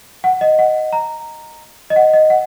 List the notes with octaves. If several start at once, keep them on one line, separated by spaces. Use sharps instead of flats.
F#5
D#5
F#5
A#5
D#5
F#5
D#5
F#5